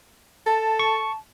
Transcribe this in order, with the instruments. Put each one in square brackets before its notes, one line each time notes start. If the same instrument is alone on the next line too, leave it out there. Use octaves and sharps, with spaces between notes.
[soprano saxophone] A4 [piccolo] A5
[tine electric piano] C#6